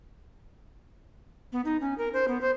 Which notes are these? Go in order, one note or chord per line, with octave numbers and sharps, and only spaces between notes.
B3
D#4
C#4
A#4
C5
B3
C5